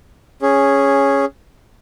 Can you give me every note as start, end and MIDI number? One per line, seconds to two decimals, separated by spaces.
0.42 1.25 61
0.42 1.25 68